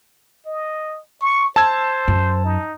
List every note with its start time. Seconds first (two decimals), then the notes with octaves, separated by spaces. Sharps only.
0.46 D#5
1.21 C#6
1.56 C5 A5 E6 G#6
2.08 F#2
2.44 D#4